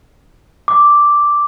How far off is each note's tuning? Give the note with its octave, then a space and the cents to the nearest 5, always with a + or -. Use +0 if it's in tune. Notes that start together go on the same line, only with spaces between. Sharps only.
D6 -5